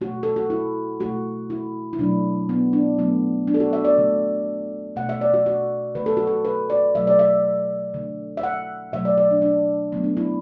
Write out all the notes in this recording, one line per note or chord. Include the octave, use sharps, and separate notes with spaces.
B2 A3 F#4
A4
F#4
E4
B2 A3 F#4
E4
E4
B2 F#3 A3 D4
B3
D4
D3 F#3 A3 B3
D4
A4
F#4
E5
D5
D3 A3
B2 A3 F#5
E5
D5
F#4
F#4
D3 A3 B4
A4
F#4
A4
B4
D5
B2 F#3 A3 E5
D5
E5
D3 A3
E5
F#5
B2 F#3 A3 E5
D5
D5
D4
D4
D3 F#3 A3 B3
D4
E4